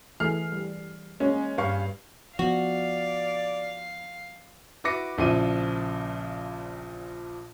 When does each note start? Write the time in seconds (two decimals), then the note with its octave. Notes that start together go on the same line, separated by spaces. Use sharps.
0.20 E3 A3 G#4 F6 C7
0.52 G3
1.20 G#3 A#3 C#4 G#4
1.58 G2 F5 C#6
2.39 F3 B3 F#4 D5 F5
4.84 E4 F#4 B4 D6 A#6 C#7
5.18 A#1 A#2 C#3 F3 E4 D#7